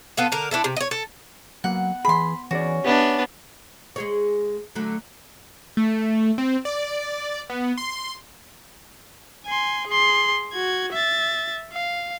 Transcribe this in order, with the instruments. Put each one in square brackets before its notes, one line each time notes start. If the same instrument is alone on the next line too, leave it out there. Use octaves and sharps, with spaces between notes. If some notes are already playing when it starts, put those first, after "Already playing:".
[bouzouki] B3 F4 A4
D3 A#4
D4 E4 A4
C3
C#5 D#5
A4
[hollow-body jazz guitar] F#3 A#3 [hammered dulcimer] B3 [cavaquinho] F#5
[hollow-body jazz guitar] E3 G#4 [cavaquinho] B5 C6
[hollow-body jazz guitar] E3 G#4 D5 [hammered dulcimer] C#4 [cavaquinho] F#4
[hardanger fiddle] B3 D4 [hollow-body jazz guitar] G4 D5 E5
[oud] G#3 G#4 C#5
D3 F#3 A3
[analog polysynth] A3
C4
D5
B3
C6
[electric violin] G#5 C6
G#4 C6
F#4 G#6
E5 A6
F5